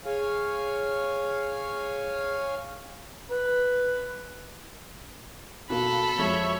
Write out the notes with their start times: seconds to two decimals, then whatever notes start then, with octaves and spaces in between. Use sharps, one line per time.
0.05 G#4 C#5 F5 G#5
3.31 B4
5.70 B2 A#3 F#4 A4 B5
6.18 F2 G#3 C#5 E5